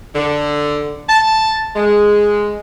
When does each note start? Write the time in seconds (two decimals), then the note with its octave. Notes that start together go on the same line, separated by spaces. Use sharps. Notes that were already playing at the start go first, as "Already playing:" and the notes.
0.14 D3
1.09 A5
1.75 G#3